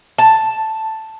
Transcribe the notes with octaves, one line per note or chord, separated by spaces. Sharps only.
A5